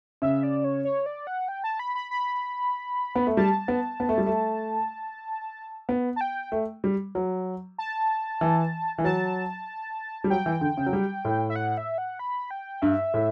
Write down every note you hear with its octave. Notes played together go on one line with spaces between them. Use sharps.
C#3 E5
D5
C#5
C#5
D5
F#5
G5
A5
B5
B5
B5
B3
A3
G3 A5
B3
B3
A3
G3
A3
B3
A5
G5
A3
G3
F#3
A5
E3
E3
F#3 A5
G3
F#3 G5
E3
D3
C#3
F#3
G3
A2
E5
F#5
E5
F#5
B5
G5
G2 E5
A2